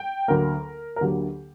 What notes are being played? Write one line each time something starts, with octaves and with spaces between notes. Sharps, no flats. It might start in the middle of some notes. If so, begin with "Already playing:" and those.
Already playing: G5
D2 D3 F#3 A#3 A#4
A#4
D2 D3 F#3 A#3 G4